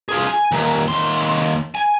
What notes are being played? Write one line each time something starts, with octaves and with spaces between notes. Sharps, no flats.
F4 G#4
G#5
D#2 A#2
D#2 C6
G#5